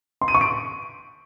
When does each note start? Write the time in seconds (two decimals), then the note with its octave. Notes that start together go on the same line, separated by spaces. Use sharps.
0.21 C6
0.28 D#7
0.35 C#6
0.41 D7